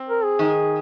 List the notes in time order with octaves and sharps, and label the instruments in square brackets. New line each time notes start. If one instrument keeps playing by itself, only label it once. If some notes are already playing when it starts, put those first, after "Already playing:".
Already playing: [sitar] C4
[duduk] A#4
G#4
[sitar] D#3